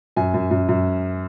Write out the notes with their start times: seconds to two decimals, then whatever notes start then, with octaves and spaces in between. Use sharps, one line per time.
0.16 F#2 G#5
0.34 F#2
0.51 F#2
0.69 F#2